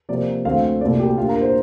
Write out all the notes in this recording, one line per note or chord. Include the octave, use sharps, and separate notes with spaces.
C3 F3 A#3 D5
D2 D3 A3 C4 F5
C2 A#2 A3 D5
G4
A#2 G3 D4 F4
A#4
C5